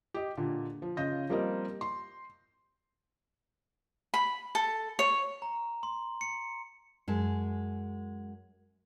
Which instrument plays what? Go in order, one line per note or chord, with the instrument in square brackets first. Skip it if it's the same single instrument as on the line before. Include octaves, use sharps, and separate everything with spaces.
[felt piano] G4 D#5
A#2 D3
F3
C#3 F4 D#5 G6 A#6
F3 G3 A#3 C4 A#4 D#5
C6
[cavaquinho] B5
A4
C#5
[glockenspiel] A#5
C6
C#7
[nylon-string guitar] F#2 G#3 A5